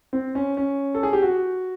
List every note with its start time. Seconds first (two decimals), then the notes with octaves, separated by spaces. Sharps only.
0.13 C4
0.35 C#4
0.57 C#4
0.95 A4
1.03 G#4
1.13 G4
1.22 F#4